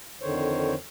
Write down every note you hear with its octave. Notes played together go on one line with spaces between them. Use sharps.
F2 D3 D#3 C5 C#5